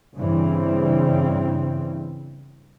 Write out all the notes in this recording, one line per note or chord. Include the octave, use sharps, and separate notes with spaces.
G2 C#3 E3 G3 C4